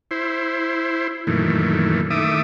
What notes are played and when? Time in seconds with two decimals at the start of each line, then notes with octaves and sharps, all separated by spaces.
0.11 E4 C5
1.27 F#2 A#2 D#3 E3 A3
2.10 D#3 A3 E5 D6 D#6